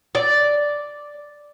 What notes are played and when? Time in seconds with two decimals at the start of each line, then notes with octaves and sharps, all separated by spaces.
0.15 D5